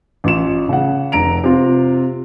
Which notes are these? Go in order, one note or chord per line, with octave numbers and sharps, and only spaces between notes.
A1 F4 E7
C#3 F#5
F1 A#5 D7 F7
C3 F4